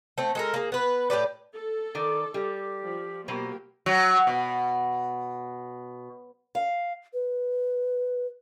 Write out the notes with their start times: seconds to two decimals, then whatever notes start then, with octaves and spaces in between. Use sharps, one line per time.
0.18 A3 C4
0.35 G#3 A4 A#4
0.54 A#3 G#4
0.72 B3 B4
1.10 A2 G4 B4 D5
1.53 A4
1.95 D#3 D5
2.34 G3 G4
2.83 F3
3.28 B2 F#3 A#3 G4 C5
3.86 F#3
4.27 B2
6.55 F5
7.14 B4